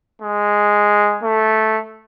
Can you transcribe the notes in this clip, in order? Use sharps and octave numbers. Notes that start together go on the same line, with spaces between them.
G#3
A3